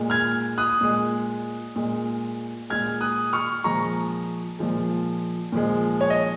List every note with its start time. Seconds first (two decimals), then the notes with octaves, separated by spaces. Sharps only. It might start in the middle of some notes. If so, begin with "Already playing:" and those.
Already playing: A#2 G#3
0.10 F6 G#6
0.58 D#6 F#6
0.81 A#2 G#3
1.76 A#2 G#3
2.70 A#2 G#3 F6 G#6
3.01 D#6 F#6
3.33 C#6 F6
3.64 A#2 F3 G#3 A#5 C#6
4.59 A#2 F3 G#3
5.52 A#2 F3 G#3
6.01 C#5
6.10 D#5